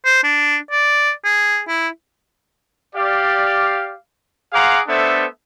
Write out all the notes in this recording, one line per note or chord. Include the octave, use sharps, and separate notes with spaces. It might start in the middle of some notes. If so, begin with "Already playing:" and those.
C5
D4
D5
G#4
E4
G4 D5 F5
G#4 C5 F5 F#5 A#5 D6
A3 B3 D4 A4 C5 E5